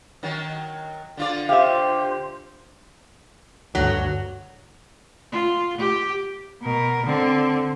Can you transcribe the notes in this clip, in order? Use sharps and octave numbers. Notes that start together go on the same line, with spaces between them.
D#3 F#3
D3 F4 D5
G4 C5 E5 F5
D2 G2 F#3
F4
G4
B2 A#4
D3 C4